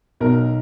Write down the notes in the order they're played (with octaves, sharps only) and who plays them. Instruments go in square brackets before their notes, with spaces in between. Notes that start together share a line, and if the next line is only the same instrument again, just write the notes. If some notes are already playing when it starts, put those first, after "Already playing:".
[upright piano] B1 A#4